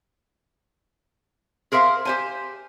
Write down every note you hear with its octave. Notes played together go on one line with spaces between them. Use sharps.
G#4 A#4 C5 E5 F5
G4 C5 G#5